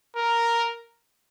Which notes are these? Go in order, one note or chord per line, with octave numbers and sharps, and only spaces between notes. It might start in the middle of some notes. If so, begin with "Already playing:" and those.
A#4